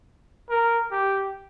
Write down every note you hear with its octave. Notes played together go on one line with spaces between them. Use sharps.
A#4
G4